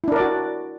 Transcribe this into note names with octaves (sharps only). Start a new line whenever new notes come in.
D4 E4 F#4 A#4 D5